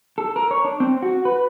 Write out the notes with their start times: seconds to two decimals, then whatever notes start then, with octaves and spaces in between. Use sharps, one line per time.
0.18 A4
0.36 A#4
0.51 C#5
0.64 D4
0.80 C4
1.02 F#4
1.25 B4